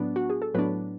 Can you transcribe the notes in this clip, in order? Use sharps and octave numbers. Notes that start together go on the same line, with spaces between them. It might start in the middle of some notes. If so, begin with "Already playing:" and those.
Already playing: A2 F#3 B3 D4
F#4
G#4
A4
A2 F#3 B3 D4 B4